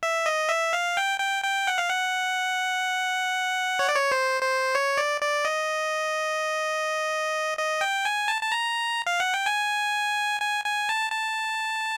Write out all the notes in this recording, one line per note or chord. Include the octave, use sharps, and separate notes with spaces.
E5
D#5
E5
F5
G5
G5
G5
F#5
F5
F#5
C#5
D5
C#5
C5
C5
C#5
D5
D5
D#5
D#5
G5
G#5
A5
A5
A#5
F5
F#5
G5
G#5
G#5
G#5
A5
A5